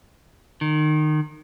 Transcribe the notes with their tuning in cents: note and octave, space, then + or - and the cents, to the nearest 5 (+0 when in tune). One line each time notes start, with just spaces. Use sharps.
D#3 -25